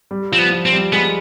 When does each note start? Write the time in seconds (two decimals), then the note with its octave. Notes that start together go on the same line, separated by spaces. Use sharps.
0.11 G3
0.32 F3 C4
0.38 B3
0.52 F3
0.66 C4
0.73 G3
0.93 G#3 B3